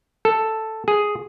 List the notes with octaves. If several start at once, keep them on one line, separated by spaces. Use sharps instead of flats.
A4
G#4